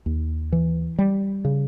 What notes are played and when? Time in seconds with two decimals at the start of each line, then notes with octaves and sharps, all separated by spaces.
0.06 D#2
0.52 E3
0.99 G3
1.45 C#3